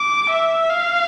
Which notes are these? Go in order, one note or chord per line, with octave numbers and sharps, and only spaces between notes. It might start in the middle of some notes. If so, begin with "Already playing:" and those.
Already playing: D6
E5
F5